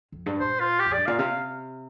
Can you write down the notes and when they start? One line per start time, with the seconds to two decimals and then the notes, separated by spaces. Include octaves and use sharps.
0.12 F2
0.26 G2
0.40 A#2 C5
0.60 F4
0.79 G4
0.86 F2
0.93 G2 D5
1.06 A#2 F5
1.19 C3 F5